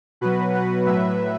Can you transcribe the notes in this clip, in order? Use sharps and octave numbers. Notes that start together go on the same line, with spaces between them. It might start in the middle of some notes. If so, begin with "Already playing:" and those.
B2 F#3 F#4 B4
F#4 B4
A2 F#3 B4 E5